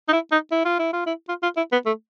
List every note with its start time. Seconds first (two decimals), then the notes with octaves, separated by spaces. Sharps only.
0.09 D#4
0.13 E4
0.32 D#4
0.52 E4
0.65 F4
0.79 E4
0.93 F4
1.06 E4
1.29 F4
1.43 F4
1.57 E4
1.72 B3
1.86 A3